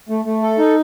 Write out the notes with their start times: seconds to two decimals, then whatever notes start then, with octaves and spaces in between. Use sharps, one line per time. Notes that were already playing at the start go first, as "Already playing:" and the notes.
0.09 A3
0.25 A3
0.42 A4
0.58 D#4